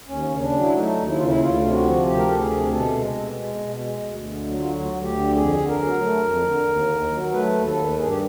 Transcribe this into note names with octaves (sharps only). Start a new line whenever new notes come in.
D#2 C#4
C#3
D4
F#3
E4
A3 D#4
D#2
E4
C#3 F4
E4
D2 F4
C3
F#4
F3
D2 G4
A#4
D2 A4
G#4
C3
B2 A4
G#3
B2
G#3
B2
G#3
D2
D3
F#3
F4
D2 F#4
D2
G4
D3
F2 G#4
D3
A#4
F#3
A3
F2
D3
D#2
D#3
F#3
A3 B4
D#2
A4
D#3
G2 G#4
G4